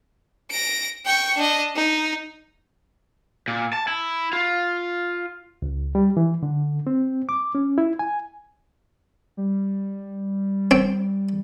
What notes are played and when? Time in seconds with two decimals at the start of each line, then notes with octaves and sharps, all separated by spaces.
0.51 A#6 D7
1.06 G5 C#6
1.37 D4 D#5
1.75 D#4
3.48 A#2
3.73 A5
3.88 E4
4.33 F4
5.62 C#2
5.95 G3
6.17 E3
6.43 D3
6.87 C4
7.29 D6
7.55 C#4
7.78 E4
7.99 G#5
9.37 G3
10.71 C4